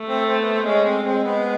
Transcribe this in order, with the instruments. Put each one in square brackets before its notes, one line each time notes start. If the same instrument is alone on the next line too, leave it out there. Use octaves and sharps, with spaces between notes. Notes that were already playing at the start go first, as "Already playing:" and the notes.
Already playing: [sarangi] A3
[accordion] C4
C4
B3
C4
[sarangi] G#3 [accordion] C#4
[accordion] C4
[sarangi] G#3 [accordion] C4
[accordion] B3